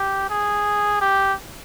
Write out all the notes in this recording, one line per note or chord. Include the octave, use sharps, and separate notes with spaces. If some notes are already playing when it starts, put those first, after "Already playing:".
Already playing: G4
G#4
G4